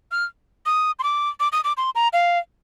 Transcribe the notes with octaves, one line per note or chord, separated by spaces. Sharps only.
F6
D#6
C6
D6
D6
D#6
D6
C6
A#5
F5